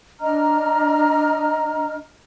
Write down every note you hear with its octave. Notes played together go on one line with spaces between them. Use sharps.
D4 D#5 A#5 F6